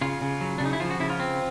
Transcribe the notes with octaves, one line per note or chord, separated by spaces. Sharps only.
C#3 F4
C#3
F#3
C#3 D4
D#4
E4
F3 F4
F#4
C#3 E4
F4
C4